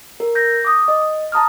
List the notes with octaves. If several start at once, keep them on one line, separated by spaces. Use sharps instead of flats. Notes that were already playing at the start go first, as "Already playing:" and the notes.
A#4
G6 A#6
D6 D#6
D#5
A5 A#5 D#6 F6